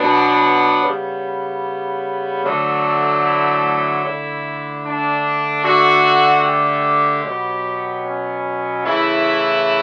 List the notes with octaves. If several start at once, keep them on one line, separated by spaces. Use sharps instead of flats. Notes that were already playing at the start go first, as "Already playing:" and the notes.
Already playing: B2 F#3 B3 D4
C#3 G3 B3
D3 F#3 A3
E4
D3 A3
D4
D3 A3 F#4
G4
B2 F#3 B3
C#4
C#3 E3 A3 E4